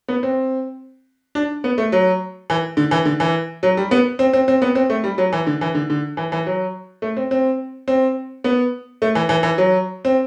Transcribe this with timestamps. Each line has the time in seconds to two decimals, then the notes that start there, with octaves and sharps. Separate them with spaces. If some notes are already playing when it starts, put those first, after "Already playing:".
0.08 B3
0.23 C4
1.35 D4
1.64 B3
1.78 A3
1.92 F#3
2.50 E3
2.77 D3
2.91 E3
3.05 D3
3.20 E3
3.63 F#3
3.77 G3
3.91 B3
4.19 C4
4.33 C4
4.48 C4
4.62 B3
4.75 C4
4.90 A3
5.04 G3
5.18 F#3
5.33 E3
5.47 D3
5.61 E3
5.75 D3
5.90 D3
6.17 E3
6.32 E3
6.46 F#3
7.02 A3
7.17 C4
7.31 C4
7.88 C4
8.44 B3
9.02 A3
9.15 E3
9.29 E3
9.43 E3
9.58 F#3
10.05 C4